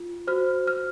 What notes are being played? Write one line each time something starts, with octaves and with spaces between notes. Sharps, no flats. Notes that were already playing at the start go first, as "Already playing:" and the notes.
Already playing: F4
F#4 C5 F6
F6